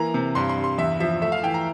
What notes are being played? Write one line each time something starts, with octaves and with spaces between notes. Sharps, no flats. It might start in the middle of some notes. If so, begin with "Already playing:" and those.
Already playing: E3 A#3 A#5
C3
G2 C6
C6
G2
C6
E2 E5
F3 E5
A3 E5
F5
E3 G5
A#5